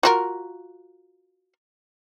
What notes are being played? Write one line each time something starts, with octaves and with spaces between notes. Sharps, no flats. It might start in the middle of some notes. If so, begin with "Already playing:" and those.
F4 F#4 A#4